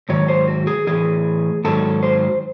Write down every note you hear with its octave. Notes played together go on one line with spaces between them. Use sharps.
G#2 D#3 F#3 C#5
C5
F#4
G#4
A2 E3 G#4
G#2 D#3 F#3 A4
C5